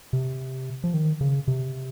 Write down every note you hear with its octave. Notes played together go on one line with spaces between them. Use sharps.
C3
F3
D#3
C#3
C3